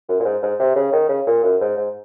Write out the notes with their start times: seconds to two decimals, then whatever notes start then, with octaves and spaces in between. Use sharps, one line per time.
0.09 F#2
0.20 A#2
0.25 G#2
0.42 G#2
0.59 C3
0.76 C#3
0.92 D#3
1.09 C#3
1.27 A#2
1.44 F#2
1.61 G#2
1.77 G#2